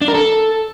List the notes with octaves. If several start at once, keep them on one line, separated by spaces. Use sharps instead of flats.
D4
A#4
A4